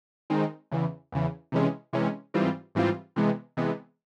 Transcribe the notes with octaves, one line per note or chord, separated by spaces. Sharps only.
D#3 G#3 C4 D#4
E2 C#3 E3
E2 C#3 E3
C3 E3 G#3 C#4
C3 E3 G#3 C#4
G#2 E3 G3 C4 F4
G#2 E3 G3 C4 F4
C3 E3 G#3 B3
C3 E3 G#3 B3